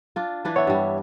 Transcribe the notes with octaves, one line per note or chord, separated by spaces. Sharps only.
D4 F4
E3 D4 B4
B3 C#5 E5
G2 G3